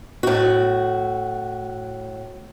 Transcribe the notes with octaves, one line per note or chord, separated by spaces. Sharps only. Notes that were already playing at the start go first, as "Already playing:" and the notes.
A2 F#4